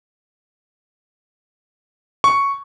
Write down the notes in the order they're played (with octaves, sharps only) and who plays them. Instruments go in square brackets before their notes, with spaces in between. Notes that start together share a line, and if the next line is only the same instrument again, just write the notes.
[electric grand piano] C#6